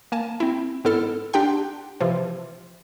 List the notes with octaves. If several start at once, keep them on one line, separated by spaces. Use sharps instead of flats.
A#3 G#5 A5
C4 E4
G#2 B3 E4 A4 F6
D4 G4 F#5 G5 C6
C3 E3 F3